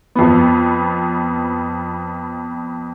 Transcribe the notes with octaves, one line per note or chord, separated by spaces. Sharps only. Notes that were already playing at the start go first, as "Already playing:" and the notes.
F2 B3